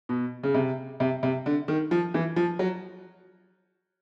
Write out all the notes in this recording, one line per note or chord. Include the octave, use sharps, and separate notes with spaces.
B2
C#3
C3
C3
C3
D3
D#3
F3
E3
F3
F#3